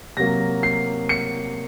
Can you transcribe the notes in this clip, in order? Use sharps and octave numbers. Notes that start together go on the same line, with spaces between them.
C3 F#3 A#3 A#6
C7
C#7